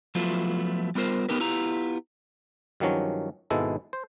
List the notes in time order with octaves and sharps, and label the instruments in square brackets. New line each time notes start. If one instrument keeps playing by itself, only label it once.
[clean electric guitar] F3 F#3 A3 B3 E4 F4
G3 B3 F4 A#4 C5
B3 D#4 G4 A#4 B4
B3 E4 F4 G4 A#5
[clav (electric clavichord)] G2 D#3 F3 F#3 C#4
G#1 G#2 B2 G#3 E4 A4
C5